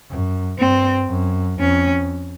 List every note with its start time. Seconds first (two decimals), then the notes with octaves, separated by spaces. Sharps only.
0.10 F#2
0.59 G2 C4
1.10 F#2
1.60 F2 C#4